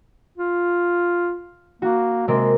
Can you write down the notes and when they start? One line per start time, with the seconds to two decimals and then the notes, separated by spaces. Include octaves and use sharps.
0.38 F4
1.82 A#3 F#4
2.28 C3 G#3 A#3 C4